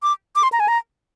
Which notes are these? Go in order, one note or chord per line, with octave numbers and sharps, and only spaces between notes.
D6
D6
C6
A#5
G#5
A#5